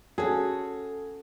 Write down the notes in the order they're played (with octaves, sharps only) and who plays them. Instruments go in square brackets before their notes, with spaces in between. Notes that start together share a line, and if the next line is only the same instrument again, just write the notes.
[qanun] C#4 F#4 [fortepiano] G#4 [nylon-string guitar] A4